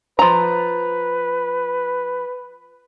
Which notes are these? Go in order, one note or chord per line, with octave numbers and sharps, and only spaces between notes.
F3 B4 A#5